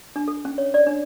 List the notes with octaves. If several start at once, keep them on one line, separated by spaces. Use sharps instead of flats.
D4
A4
C#4
C#5
D5
D4